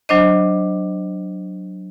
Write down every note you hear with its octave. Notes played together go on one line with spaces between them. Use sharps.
F#3 D4 C5 D#5